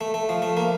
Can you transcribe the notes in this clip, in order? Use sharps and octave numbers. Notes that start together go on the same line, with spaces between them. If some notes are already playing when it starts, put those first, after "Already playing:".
A3
A3
F3
A3
A#3